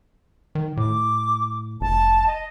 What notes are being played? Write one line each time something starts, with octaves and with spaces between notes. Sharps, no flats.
D#3
A2 D6
F1 A5
D#5